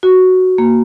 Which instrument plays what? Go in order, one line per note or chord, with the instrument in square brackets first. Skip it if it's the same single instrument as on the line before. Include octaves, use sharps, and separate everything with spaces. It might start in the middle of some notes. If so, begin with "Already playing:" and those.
[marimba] F#4
A#3